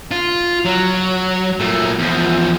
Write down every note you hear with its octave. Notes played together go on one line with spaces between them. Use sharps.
F4
F#3
A#2 A3
E2 F3